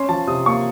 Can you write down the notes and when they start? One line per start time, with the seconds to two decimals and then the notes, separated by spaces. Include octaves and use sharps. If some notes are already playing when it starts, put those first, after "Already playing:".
Already playing: C#4 C6
0.09 F3 A5
0.27 C3 D#6
0.46 A#3 C#6